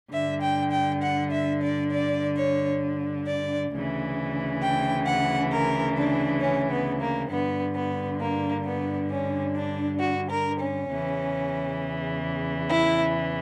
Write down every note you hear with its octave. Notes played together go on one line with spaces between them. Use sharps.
G2 D3 E5
G5
G5
F#5
E5
D5
D5
C#5
D5
D2 C#3 E3
G5
F#5
A#4
D4
C#4
B3
A#3
G2 D3 B3
B3
A#3
B3
C#4
D4
F#4
A#4
C#4
E2 C#3 E3
E4